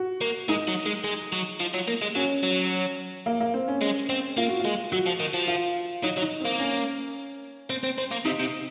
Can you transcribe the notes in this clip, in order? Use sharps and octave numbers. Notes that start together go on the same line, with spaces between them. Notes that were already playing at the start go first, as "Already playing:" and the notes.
Already playing: F#4
A#3
G#3 D#4
F#3
G#3
G#3
F#3
F3
F#3
A#3
G#3
F#3 C#4
F#3
A#3
A#3
C4
C#4
G#3
C4
A#3 F4
F#4
F4
G#3
F#3 F#4
F3
D#3
F3
F4
F#3 D#4
F#3
D#4
A#3 C4
C#4
C4
C4
C4
A#3
C3 D#4
C3